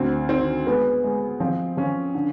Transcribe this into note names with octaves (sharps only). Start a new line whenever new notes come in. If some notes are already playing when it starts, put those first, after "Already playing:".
Already playing: D2 C4
D#3 C4
G#3 B3
G#3
F3 C4
F3 C#4
D3